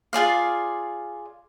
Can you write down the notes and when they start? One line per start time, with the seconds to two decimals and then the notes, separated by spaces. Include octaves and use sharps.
0.13 F4 G#4 D5 F5